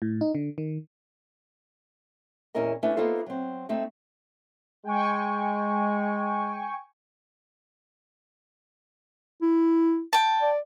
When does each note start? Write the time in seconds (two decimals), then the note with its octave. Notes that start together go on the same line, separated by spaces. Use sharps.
0.02 A2
0.21 D#4
0.35 D3
0.58 D#3
2.55 E2 A#2 C#4 E4 A#4 D#5
2.83 A3 C#4 D4 E4 B4 C#5
2.96 A#3 B3 D#4 F4 A4 C5
3.26 F#3 C4
3.69 A3 C4 D#4
4.85 G#3 G5 G#5 C#6
9.42 E4
10.13 G5 A5
10.42 D5